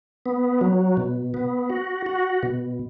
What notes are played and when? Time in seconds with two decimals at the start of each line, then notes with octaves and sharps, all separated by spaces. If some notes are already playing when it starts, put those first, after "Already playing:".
0.26 B3
0.61 F#3
0.97 B2
1.34 B3
1.70 F#4
2.06 F#4
2.43 B2